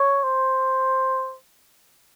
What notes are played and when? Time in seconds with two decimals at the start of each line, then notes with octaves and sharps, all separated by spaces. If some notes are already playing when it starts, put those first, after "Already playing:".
Already playing: C#5
0.23 C5